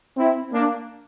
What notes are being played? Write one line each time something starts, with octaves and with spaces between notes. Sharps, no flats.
C4 E4
A#3 D4